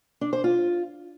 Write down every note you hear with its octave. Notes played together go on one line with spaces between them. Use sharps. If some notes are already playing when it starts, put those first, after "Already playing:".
D4
C5
F4